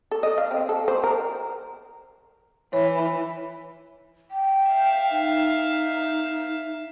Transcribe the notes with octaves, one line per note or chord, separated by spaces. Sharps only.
A4
D#5
F5
C4
A4
C5
A#4
E3 C#5
G5
E5 F5
D#4